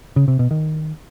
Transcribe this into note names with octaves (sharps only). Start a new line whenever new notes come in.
C#3
C3
B2
D#3